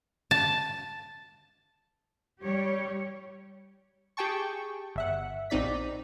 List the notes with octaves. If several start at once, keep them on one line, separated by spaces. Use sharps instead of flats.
A5
G3 G4 C#5
G4 G#4 G5 A5 C#6
G1 E5 F#5
A#1 C4 D#4 D5 B6